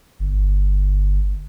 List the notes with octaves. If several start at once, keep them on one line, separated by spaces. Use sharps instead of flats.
G1